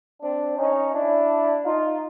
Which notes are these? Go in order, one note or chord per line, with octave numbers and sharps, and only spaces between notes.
C4 D4
C#4 D#4
D4 E4
D#4 F4